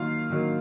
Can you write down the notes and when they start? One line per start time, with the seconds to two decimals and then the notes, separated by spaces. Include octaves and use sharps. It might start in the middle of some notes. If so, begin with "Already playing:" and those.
Already playing: D#3 F#3 A#3 F4 F5
0.30 D#3 F#3 A#3